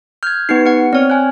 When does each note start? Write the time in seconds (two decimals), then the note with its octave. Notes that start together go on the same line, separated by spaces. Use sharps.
0.23 F6 G6 G#6
0.49 B3 D#4 G4 B4 C7
0.66 B3 F#5 C#7
0.93 C4 C#5 D5 F6
1.10 G#5 F#6